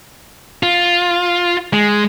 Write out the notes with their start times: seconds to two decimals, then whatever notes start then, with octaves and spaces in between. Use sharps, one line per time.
0.63 F4
1.73 G#3